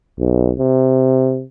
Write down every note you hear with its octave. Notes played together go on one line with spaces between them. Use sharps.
B1
C3